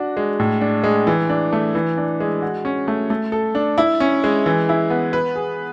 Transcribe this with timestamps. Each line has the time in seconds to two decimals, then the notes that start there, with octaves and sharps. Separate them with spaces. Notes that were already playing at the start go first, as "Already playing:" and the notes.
Already playing: D4 F#4
0.17 G#3
0.40 A2
0.61 D4
0.84 G#3
1.07 E3
1.30 D4
1.53 A3
1.75 E3
1.98 D4
2.20 G#3
2.42 F#4
2.65 C#4
2.88 A3
3.10 A3
3.32 A4
3.55 D4
3.78 E4
4.00 C#4
4.24 G#3
4.46 E3
4.69 E4
4.90 B3
5.13 B4
5.36 G#4